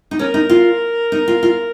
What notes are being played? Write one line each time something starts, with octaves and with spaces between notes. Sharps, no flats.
D#4
C#4 A#4
D#4
F4
D#4
F4
F4